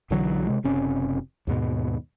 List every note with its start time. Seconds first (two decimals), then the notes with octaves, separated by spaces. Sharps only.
0.11 B1 D3 E3 F#3
0.47 C3 G#3
0.64 F#1 C3 C#4
1.47 D#2 G#2 B2